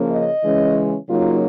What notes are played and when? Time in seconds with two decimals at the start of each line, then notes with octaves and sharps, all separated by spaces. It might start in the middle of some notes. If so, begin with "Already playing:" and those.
Already playing: C#3 F3 A#3 C#4
0.10 D#5
0.43 C#3 E3 G#3 C#4
1.08 C#3 F#3 A#3 D#4 F4